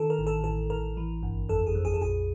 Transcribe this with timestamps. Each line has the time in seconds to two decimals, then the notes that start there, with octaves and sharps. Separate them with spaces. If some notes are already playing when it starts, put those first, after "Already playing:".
Already playing: D#3 A4
0.10 A#4
0.19 A1
0.27 A4
0.44 A1 A4
0.70 A1 A#4
0.97 E3
1.23 G1
1.49 F2 A4
1.67 G#4
1.75 F2
1.85 G#4
1.94 A4
2.01 A#1 G#4